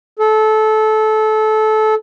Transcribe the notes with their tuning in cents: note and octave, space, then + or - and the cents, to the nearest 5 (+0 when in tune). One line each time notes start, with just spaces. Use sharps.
A4 -20